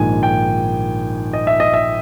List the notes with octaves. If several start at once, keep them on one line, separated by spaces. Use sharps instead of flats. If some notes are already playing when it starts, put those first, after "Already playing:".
Already playing: A#1 G#2 D#3 G#5
G5
D#5
E5
D#5
E5